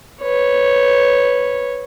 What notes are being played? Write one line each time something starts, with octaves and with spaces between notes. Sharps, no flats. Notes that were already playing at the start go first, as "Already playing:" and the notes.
B4 C#5